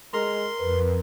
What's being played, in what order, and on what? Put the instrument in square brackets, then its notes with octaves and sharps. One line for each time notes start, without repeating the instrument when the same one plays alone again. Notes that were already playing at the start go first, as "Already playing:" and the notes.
[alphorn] G#3 [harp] A#4 [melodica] C6
[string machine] F2 [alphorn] B4